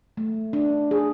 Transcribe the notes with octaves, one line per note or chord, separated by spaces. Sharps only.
A3
D4
G#4